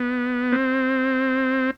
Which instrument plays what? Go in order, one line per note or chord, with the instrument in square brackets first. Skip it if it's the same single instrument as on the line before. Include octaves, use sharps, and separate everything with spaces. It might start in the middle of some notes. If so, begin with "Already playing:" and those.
Already playing: [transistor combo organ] B3
C4